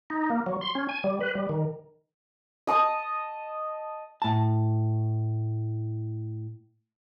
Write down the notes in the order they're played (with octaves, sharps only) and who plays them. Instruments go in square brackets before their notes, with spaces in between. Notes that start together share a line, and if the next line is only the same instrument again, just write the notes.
[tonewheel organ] D#4
A#3
F#3
C6
C#4
G#5
G3
B4
G3
D#3
[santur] D#5 A5 D#6
[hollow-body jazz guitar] A2 A5